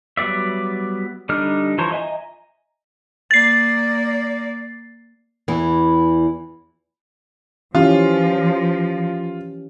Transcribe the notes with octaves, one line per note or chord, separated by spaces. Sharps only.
F#3 G3 B3 D5 E5
D3 G3 D4 D#4 F6
E3 F3 C5 C#5 A#5
D#5 E5 G#5 A#5
A#3 D5 A6 C7
E2 E3
E3 F3 C#4 F4 G4